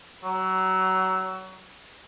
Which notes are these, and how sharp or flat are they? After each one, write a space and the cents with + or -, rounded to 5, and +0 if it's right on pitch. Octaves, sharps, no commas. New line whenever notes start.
F#3 +25